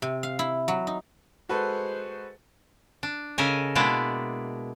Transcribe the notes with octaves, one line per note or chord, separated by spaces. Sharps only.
C3
F5
E4
F#3
D#4
G#3 F#4 A4 B4 C5
D4
C#3 A4 A#4 D#5 G#5
B2 G#3 A#3 D4 E4 D5